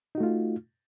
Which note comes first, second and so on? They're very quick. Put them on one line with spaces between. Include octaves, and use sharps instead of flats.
D#4 F#4 A3 F4